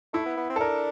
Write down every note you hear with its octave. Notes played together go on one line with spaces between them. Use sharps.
A3 E4
B3
B3
C4
A4
D4 A#4